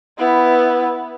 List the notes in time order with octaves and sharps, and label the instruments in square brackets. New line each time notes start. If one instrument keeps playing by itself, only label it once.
[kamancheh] B3 E4